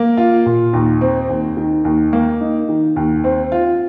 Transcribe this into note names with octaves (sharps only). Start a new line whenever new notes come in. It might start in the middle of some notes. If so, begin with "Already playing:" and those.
Already playing: A#3
F4
A#2
D#2
C4
D#2
D#3
D#2
A#3
D#4
D#3
D#2
C4
F4